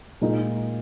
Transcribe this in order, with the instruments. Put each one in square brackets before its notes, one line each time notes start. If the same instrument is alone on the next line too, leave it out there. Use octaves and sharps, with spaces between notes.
[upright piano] A#2 G#3 D#4